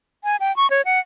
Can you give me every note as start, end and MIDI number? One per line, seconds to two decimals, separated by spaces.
0.24 0.36 80
0.40 0.54 79
0.57 0.69 85
0.70 0.82 73
0.85 1.00 78